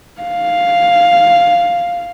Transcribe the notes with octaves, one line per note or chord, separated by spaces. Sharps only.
F5